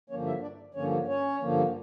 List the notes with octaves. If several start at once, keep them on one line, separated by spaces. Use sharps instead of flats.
G2 D3 F3 A#3 C#4 C#5
E4 E5
D4 D5
G2 D3 F3 A#3 C#4 C#5
C#4 C#5
G2 D3 F3 A#3